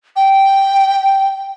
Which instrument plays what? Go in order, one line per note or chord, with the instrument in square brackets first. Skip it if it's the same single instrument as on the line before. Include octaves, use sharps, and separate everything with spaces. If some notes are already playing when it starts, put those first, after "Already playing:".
[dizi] G5